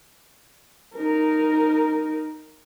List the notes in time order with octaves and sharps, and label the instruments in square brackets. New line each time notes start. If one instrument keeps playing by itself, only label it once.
[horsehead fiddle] D#4 A#4